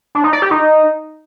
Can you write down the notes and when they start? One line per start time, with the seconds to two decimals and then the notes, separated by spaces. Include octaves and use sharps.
0.15 D4
0.24 D#4
0.33 D5
0.42 G4
0.51 D#4